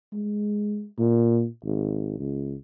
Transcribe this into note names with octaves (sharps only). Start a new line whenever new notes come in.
G#3
A#2
G#1
C#2